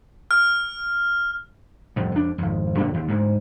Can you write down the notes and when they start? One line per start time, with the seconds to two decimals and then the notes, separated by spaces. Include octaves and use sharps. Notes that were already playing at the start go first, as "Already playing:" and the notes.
0.31 F6
1.96 C2 F2 A2
2.12 F2 D4
2.38 G#1 F2
2.77 F#2 A#2 D3 D4
2.94 D#2
3.07 D2 G#2